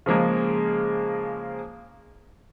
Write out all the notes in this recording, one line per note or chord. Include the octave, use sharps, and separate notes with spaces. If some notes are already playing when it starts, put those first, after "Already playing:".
C#3 F3 G#3 A#3